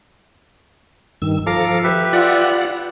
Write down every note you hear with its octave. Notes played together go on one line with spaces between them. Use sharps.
G2 D#3 E6
F3 A4 F5 A#5 D6
G4 B4 E5
F4 D5 F#5